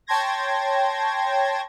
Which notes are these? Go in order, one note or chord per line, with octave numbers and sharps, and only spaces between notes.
C#5 G5 A5 C6 G#6 A#6